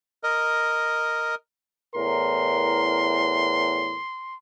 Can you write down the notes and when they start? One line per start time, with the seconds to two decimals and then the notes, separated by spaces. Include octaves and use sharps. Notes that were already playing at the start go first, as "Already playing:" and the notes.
0.23 A#4 D#5
1.95 E2 A2 A#4 C6